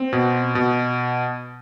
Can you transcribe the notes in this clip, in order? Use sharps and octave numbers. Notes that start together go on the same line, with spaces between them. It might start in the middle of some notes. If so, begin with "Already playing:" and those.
Already playing: C4
B2
B2